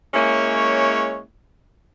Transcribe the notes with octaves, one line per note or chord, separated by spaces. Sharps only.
G#3 A#3 C#4 E4 C#5